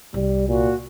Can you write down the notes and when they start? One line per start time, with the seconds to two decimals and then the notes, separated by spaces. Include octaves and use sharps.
0.14 C2 G3
0.48 A#2 F#4